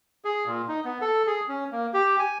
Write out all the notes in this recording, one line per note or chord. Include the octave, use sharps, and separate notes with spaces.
G#4
A#2
D#4
B3
A4
G#4
C#4
A#3
G4
G#5